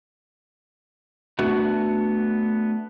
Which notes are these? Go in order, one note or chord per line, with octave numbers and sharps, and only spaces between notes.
A3 B3 D4 F#4